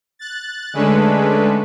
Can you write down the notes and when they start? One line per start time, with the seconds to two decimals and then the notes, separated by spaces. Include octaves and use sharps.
0.19 F#6 A6
0.73 D3 G#3 A3 C#4 D4 B4